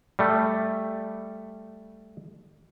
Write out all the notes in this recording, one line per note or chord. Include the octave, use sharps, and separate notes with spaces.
G3 A3